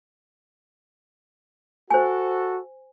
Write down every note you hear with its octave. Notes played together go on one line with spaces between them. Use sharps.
F#4 A4 C5 G#5